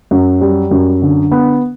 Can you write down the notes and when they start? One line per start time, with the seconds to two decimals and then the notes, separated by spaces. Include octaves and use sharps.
0.11 F#2
0.41 G3
0.71 F#2
1.02 D3
1.31 B3